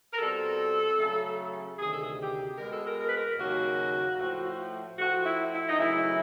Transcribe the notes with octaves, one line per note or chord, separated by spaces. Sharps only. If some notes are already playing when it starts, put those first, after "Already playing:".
A#4
B2 G3 C4 A4
C#3 F#3 A3
D2 C3 D#3 G#4
A4
G#4
G4
B2 G#3 B3 A#4
A4
A#4
A#4
B4
A#4
D#2 C#3 F#3 A#3 F#4
A2 F3 A3
A2 F3 A3 F#4
E4
E4
D#4
F#2 C#3 E3 A3 E4